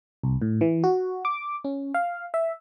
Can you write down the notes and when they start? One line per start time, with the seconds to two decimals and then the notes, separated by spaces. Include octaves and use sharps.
0.23 C2
0.42 A2
0.61 E3
0.84 F#4
1.25 D6
1.64 C#4
1.94 F5
2.34 E5